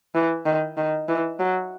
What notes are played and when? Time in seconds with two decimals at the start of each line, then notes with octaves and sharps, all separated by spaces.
0.15 E3
0.46 D#3
0.77 D#3
1.08 E3
1.39 F#3